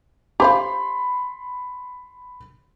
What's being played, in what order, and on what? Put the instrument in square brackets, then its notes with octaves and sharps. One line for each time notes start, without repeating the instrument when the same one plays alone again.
[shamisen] G4 C5 F5 [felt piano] B5 C6